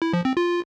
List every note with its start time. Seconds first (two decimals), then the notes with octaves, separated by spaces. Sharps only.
0.02 E4
0.13 F3
0.25 C4
0.37 F4